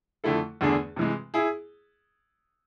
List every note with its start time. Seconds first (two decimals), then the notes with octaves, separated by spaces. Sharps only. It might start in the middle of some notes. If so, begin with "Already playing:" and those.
0.24 F2 D3 A3 E4 A4
0.61 E2 D3 A3 D4 G#4
0.96 C3 E3 G#3
1.34 E4 G#4